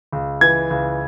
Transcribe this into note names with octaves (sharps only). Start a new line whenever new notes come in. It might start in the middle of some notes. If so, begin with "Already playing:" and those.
C#2
E3 G#6
C#2